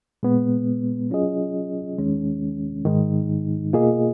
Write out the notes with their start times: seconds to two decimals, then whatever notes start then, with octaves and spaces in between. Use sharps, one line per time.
0.23 A#2 G#3 B3
1.10 F#3 C#4 F4 G#4 D#5
1.98 D#2 D#3 G#3 C#4
2.85 G#2 D#3 G#3 D#4
3.73 B2 A#3 F4 G#4 D#5